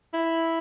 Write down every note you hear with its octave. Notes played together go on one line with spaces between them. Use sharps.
E4